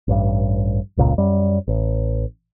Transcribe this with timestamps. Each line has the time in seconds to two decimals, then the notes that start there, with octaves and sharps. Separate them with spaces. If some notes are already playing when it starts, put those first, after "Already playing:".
0.08 A1 G2
0.97 E1 C#2 A#2
1.18 F#2 G3
1.68 A1